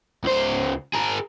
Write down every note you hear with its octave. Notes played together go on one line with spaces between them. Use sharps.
C#2 C5
G#4 A#4